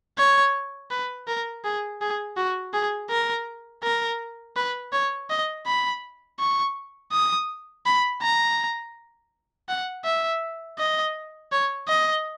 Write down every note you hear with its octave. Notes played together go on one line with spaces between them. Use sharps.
C#5
B4
A#4
G#4
G#4
F#4
G#4
A#4
A#4
B4
C#5
D#5
B5
C#6
D#6
B5
A#5
F#5
E5
D#5
C#5
D#5